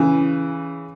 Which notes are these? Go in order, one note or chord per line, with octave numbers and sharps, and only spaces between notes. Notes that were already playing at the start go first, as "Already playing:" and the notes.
Already playing: C#3 E3